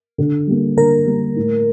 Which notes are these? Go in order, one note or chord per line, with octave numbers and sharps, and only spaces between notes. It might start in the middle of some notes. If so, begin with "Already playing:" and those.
D3
G3 A#3
D3 A#4
G3 A#3
A2